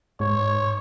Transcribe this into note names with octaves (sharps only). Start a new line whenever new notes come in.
G#2 C#5